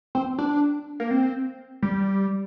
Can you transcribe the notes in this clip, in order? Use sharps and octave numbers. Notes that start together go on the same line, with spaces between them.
C4
D4
A#3
C4
G3